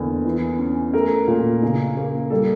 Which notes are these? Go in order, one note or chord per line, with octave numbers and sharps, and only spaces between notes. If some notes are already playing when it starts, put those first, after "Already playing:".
Already playing: E2 D3 A#3
E3
C#4
A3 A#4
A#2
C#3
A#3
G3 A4